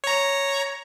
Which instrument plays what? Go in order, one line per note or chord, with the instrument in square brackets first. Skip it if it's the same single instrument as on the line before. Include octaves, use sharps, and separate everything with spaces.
[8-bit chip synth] C#5 A#5